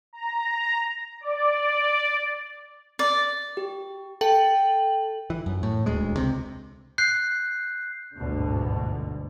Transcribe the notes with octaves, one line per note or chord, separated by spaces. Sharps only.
A#5
D5
D5
G4
A4 G5 F#7
E3
F#2
A2
D#1 D2 G#3
C#2 C3
F#6 G6 C7
G1 D2 G#2 B2 D3